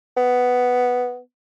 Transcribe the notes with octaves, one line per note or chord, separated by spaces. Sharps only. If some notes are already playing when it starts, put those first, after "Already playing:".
B3